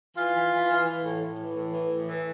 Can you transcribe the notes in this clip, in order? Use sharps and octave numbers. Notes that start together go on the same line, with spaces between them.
E3 F4
E3
E3
E3
E3
A2
A2
E3
A2
E3
A2
E3